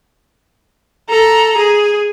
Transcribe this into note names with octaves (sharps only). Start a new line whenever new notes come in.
A4 A#5
G#4